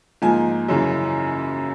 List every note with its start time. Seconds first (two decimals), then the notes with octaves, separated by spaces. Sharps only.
0.22 G#2 F3 A#3 G#5
0.69 F#2 C#3 E3